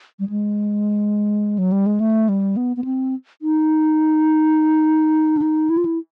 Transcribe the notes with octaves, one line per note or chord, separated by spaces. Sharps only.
G3
G#3
F#3
G3
G#3
A3
G3
B3
B3
C4
D#4
D4
D#4
E4
F4
E4